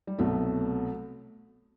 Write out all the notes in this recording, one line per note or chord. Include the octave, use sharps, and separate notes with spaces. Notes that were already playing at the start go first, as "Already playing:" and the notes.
G3
C2 B2 F#3 A3